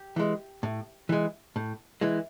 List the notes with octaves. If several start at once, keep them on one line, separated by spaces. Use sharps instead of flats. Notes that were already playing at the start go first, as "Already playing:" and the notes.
Already playing: G4
E3 G#3
A2
E3 G#3
A2
E3 G#3